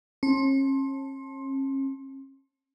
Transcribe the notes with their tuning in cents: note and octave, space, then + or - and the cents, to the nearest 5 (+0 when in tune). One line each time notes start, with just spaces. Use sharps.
C#4 -40 A5 +0 C6 +20